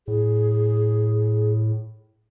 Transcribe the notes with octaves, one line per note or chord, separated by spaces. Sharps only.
A2 G#4